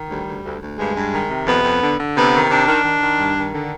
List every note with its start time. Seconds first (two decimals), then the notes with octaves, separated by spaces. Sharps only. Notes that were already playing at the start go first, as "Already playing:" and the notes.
Already playing: D#3
0.09 D2 G3
0.27 D2
0.44 D2
0.61 D2
0.77 G2 G#3
0.96 G2
1.12 D#3
1.30 C3
1.46 F2 B3
1.64 F2
1.82 D3
1.98 D3
2.16 C3 B3
2.33 D#3
2.49 C3 D4
2.67 D#3
2.84 D#3
3.01 D#3
3.19 G2
3.36 D#3
3.53 D3